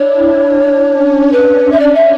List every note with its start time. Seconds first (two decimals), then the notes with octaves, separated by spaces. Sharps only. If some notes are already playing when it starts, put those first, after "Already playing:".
Already playing: D4 E4 C#5
0.37 D4
0.85 C#4
1.31 B4
1.71 E5
1.79 D5
1.94 E5